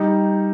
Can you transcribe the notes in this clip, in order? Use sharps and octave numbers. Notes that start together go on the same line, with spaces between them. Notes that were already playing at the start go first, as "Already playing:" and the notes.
Already playing: G3 D#4